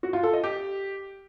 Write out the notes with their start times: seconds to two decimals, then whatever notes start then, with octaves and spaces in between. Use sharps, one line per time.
0.03 F#4
0.13 F4
0.23 A4
0.33 D#5
0.44 G4